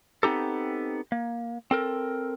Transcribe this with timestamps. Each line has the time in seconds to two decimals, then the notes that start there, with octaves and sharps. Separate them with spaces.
0.23 B3 C4 D#4 G4 A4
1.12 A#3
1.71 C4 A4 A#4